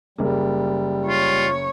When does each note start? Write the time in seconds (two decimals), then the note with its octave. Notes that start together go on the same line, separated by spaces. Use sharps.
0.18 F#1 G3 A#3
1.07 F4 C#5